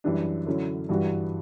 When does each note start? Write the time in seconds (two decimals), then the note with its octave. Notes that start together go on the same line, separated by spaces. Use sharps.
0.04 F#2 E3 G3 D4
0.47 D3 F#3 C#4 E4
0.89 G2 E3 G3 D4 F#4